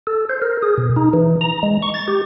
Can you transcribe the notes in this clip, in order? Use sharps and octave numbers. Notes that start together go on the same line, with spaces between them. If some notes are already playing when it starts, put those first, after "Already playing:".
A4
C5
A#4
G#4
B2
D#4
E3
A#5
G#3
C#6
A6
G4